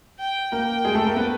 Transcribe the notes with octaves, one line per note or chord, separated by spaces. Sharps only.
G5
A#3 A#4 G5
G#3 G#4
A3 A4
A#3 A#4
B3 B4